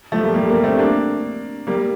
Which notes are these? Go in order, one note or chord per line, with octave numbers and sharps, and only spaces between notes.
F3 A3
G3 A#3
G3 A#3
G3 A#3
A3 C4
A#3 D4
G3 A#3